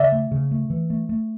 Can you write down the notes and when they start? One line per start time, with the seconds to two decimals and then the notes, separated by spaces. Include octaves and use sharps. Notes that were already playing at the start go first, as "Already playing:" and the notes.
Already playing: C#3 D5 E5
0.12 A3
0.31 C#3
0.51 A3
0.70 E3
0.90 A3
1.09 A3